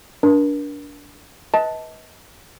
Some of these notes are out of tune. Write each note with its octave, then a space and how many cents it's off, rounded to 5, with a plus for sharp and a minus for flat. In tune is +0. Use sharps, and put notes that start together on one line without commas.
D4 -20 A#4 +40
B4 -15 D#5 +35 A5 +0